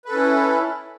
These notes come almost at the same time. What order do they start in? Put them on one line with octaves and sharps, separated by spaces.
B4 A4 C#4 E4